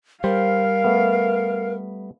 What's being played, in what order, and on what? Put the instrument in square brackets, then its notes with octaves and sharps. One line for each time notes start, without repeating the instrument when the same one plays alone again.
[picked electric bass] G3 [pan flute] A#4 [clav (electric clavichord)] C5 [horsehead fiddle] F5
[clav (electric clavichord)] A3 B3